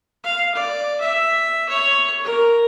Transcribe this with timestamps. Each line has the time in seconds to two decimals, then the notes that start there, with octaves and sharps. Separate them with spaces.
0.24 F5
0.55 D5
1.01 E5
1.69 C#5
2.24 A#4